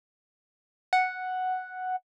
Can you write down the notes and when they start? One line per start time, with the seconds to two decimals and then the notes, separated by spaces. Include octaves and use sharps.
0.93 F#5